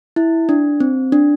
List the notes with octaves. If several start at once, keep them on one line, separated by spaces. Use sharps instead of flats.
E4
D4
C4
D4